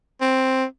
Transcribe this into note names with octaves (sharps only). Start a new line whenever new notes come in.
C4